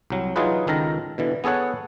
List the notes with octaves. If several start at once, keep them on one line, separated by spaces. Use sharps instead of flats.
C2 F#3
E3 F#3 D#4 F4 G#4 B4
C#2 D#3 A4 A#4 A#5
B2 D3 E3
B3 G#4 A4 C#5 F#5